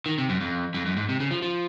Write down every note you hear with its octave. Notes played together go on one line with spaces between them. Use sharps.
D#3
C3
F#2
F2
F2
F#2
G#2
C3
C#3
F3
F3